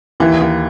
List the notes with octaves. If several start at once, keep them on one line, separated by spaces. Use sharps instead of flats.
D#2 E3
D#2